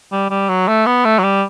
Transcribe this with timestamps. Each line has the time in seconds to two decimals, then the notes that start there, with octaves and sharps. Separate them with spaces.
0.12 G3
0.30 G3
0.49 F#3
0.68 A3
0.86 B3
1.05 A3
1.19 F#3
1.24 G3